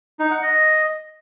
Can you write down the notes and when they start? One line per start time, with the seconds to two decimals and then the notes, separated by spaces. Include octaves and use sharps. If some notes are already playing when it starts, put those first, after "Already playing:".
0.20 D#4
0.31 F#5
0.42 D#5